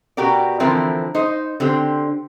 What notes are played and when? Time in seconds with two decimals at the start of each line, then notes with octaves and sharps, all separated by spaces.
0.17 B2 F#4 G4 A#4 D5
0.60 D3 E3 F3 C4 E4 A#4
1.15 D#4 C5 D#5
1.60 D3 C4 G4 C5